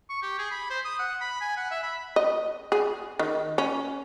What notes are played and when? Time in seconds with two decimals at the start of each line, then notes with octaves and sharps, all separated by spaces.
0.10 C#6
0.22 G4
0.39 G#4
0.52 B5
0.70 C5
0.85 D#6
0.99 F#5
1.21 B5
1.41 G#5
1.57 F#5
1.71 E5
1.83 B5
2.16 D#5
2.72 G#4
3.19 D#3
3.58 C#4